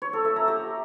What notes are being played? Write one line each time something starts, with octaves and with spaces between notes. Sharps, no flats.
C#5
A4
E5
A#5
G4